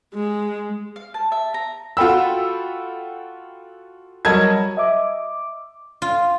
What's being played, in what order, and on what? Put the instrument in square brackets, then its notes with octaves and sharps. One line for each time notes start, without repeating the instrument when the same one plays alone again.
[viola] G#3
[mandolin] F5
A5
E5
A#5
[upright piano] F4 F#4 A4 G5 B5 E6
F#3 G3 A#4 D#5 A5 G#6
[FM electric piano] D#5 E5 D6
[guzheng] F4